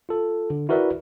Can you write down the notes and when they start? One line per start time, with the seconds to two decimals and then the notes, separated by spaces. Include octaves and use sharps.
0.09 F4 A4
0.50 D3
0.69 E4 F#4 A#4 B4 D5 E5